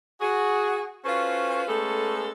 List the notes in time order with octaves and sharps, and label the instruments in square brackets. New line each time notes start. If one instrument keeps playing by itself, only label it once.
[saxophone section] F#4 G#4
C#4 F4 F#4 A4 B4 C5
G#3 A3 B3 C#4 A4